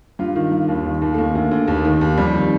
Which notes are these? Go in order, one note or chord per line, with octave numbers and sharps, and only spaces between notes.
G2 F4
D#3
G2
D#2
D#3
D#2
A3
D#3 A#3
D2
D2
D#2
D#3
D#2
F2 G3
D#3